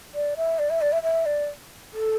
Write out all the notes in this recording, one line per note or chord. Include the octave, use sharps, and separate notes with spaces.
D5
E5
D5
E5
D5
E5
E5
D5
A4